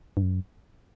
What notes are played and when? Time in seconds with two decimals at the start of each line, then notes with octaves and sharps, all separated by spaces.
0.17 G2
0.22 F#2